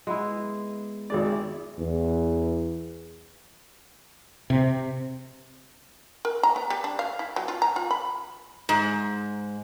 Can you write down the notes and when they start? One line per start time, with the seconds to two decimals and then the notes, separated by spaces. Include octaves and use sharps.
0.07 G#3 B3 E4
1.10 G#1 G#3 D5
1.32 E4
1.78 E2
4.50 C3
6.25 A#4
6.43 A#5
6.56 B3
6.70 G3
6.84 D4
6.99 F5
7.19 E4
7.36 F#3
7.48 F4
7.62 A#5
7.76 F4
7.91 B5
8.69 G#2